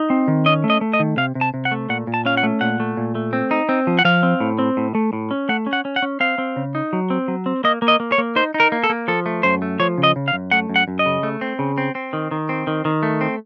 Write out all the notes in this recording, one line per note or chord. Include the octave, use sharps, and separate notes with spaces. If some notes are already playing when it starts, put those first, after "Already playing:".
Already playing: D#4
C4
D#3
C#4 D#5
A3
D#5
A3
D#5
D#3
C3 F5
C3
A5
C3
F#5
A3
A#2 F#5
A#2
A5
C#4 F5
F#5
A3
A#2 F#5
A3
A#2
A3
C4
D#4
C4
F3
F#5
F3 F5
C4
A2
C4
A2
A3
A2
C#4
A3 F#5
C#4
F#5
C#4
F#5
C#4
C4 F5
C4
C#3
D#4
F#3
C4
F#3
C4
A#3 D#5
A#3
D#5
A#3
C#5
A#3
D#4 C5
D#4
A#4
A#3
A4
A#3
F3 A4
A3
F#2 C5
A3
F3 C#5
C#3
D#5
C#3
F5
F#2
A3 F#5
F#2
F#5
F#2
D#5
C#3
A3
C4
C#3
C4
C4
D#3
D#3
C4
D#3
D#3
A3
C4